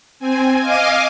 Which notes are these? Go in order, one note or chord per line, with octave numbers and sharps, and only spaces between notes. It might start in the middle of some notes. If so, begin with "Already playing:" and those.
C4 G#5
D#5 F5 G#5 D6 D#6 F6